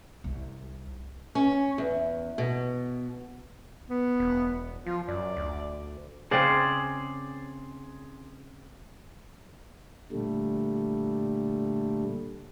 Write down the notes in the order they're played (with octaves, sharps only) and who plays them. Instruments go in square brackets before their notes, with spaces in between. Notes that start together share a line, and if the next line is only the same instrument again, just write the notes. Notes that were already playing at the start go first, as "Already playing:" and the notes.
[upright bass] C2
[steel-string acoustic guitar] C#4
E2
B2
[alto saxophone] B3
[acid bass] E1
[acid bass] F3 [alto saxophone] F4
[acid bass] F#2 [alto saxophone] D5
[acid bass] D2
[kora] C#3 C4 [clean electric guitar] G#4 C5 D5
[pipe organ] A#2 D3 G3 A3